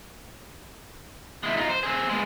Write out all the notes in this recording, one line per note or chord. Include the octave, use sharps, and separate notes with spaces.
G#3 E4
D#4 F4
C5
C4 G#4
G#3 B3